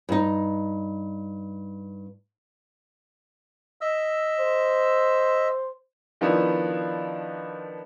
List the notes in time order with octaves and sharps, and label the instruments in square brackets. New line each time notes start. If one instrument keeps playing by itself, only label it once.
[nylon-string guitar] G2 D#4
[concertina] D#5 E5 E6
[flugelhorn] C5
[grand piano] D#3 F3 B3 D4 E4